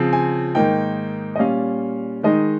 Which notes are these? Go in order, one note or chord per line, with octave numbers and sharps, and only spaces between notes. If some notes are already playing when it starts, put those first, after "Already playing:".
Already playing: C#3 F3 C4
G#5
G#2 D#3 A#3 D#4 G5
D#5
A#2 G3 C#4 F5
D#3 G#3 D#4 D#5